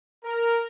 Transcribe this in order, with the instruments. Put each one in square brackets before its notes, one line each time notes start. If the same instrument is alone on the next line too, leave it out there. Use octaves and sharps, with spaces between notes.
[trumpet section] A#4